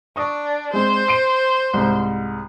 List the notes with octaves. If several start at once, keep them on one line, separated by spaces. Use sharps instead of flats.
D4 C#6 D#6
G#3 C4 C5
C7 D7 D#7
C2 G#2